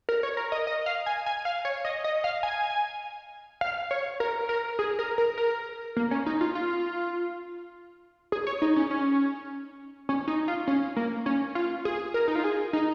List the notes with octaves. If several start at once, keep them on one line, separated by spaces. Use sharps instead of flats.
A#4
C#5
A#4
D#5
D#5
F5
G#5
G#5
F5
C#5
D#5
D#5
F5
G#5
F5
C#5
A#4
A#4
G#4
A#4
A#4
A#4
A#3
C#4
D#4
F4
F4
G#4
C#5
D#4
C#4
C#4
C#4
D#4
F4
C#4
A#3
C#4
F4
G#4
A#4
D#4
F4
G#4
D#4